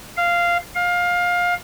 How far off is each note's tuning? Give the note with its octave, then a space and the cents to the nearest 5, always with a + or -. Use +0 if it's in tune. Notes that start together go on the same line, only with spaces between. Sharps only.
F5 -10
F5 +20